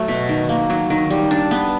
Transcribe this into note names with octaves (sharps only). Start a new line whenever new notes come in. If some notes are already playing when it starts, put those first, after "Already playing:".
Already playing: F#3 A3
B2
D#3
A#3
F#3
D#3
G3
D4
B3